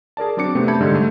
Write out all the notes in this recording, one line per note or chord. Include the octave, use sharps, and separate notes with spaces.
G#4 A#4 D5 A5
F#3 C4 D4 D6 C#7
C3 A3 B3 C4 D4
E5 A5 B5 G6 G#6 C#7
G#2 D3 G3 G#3 D#4
A3